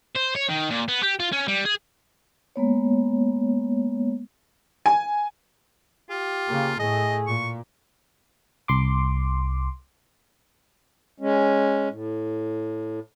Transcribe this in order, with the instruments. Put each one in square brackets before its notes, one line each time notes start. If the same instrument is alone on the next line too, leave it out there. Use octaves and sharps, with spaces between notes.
[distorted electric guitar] C5
C#5
D#3
A#2
B3
G4
F4
C#4
G3
G#4
[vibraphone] G#3 A#3 B3 C#5
[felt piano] G#5
[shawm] F4 [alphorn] G4
[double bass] C#3 A#3
[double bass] A2 A3 [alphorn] G#4 [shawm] D#5
[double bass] A#2 [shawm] C#6
[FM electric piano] C2 C6 D6
[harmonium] G#3 C#4
A2